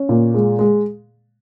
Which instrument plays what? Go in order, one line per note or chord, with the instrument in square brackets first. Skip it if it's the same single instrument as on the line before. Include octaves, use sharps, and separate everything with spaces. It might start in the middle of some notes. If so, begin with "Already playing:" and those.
Already playing: [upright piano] C#4
A#2
G#3
G#3